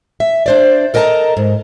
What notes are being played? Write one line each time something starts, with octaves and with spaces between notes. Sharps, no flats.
E5
D4 C5 D5
A4 A#4 D#5 G5 A5 A#5
G#2